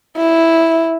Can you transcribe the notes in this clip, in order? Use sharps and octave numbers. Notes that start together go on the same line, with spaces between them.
E4